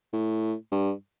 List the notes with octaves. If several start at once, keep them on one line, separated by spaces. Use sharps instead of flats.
A2
G2